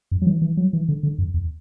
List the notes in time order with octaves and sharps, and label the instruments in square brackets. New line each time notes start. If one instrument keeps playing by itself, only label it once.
[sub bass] F#2
F#3
E3
E3
F#3
E3
D3
D3
F#2
E2